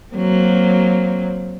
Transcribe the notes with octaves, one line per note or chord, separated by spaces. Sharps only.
F#3 A#3 C4